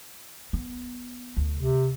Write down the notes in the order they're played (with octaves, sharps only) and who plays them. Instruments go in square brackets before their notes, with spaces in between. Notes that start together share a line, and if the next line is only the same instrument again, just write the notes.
[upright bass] B3
D2
[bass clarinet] C3